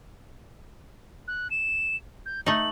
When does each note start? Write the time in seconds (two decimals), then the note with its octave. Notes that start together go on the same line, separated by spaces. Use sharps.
1.28 F#6
1.51 E7
2.26 G6
2.46 A3 D#4 F#7